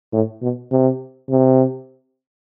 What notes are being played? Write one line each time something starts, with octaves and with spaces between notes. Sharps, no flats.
A2
B2
C3
C3